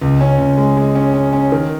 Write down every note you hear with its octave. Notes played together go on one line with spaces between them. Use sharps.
C#2
C#4
C#2
G#3
G#3
C#4
C#4
C#4
D#3